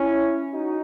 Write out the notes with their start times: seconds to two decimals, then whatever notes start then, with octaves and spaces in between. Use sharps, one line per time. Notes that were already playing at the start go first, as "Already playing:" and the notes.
Already playing: C#4 E4
0.52 D#4 F#4